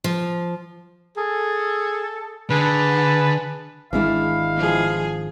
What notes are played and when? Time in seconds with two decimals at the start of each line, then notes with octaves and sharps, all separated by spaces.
0.04 F3
1.17 G#4 A4
2.50 D3 G#4 B4 A5
3.93 G#1 E3 G#3 C#4 D4 E4 F5
4.56 F3 G#4